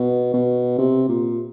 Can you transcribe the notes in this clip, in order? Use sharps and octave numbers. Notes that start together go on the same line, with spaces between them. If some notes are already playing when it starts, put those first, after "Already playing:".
Already playing: B2
B2
C3
A#2